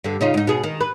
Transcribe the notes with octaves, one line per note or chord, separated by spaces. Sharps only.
G2 D3
C#3 D#4 F4
G#2 D#4
B2 G#4
D#3
B4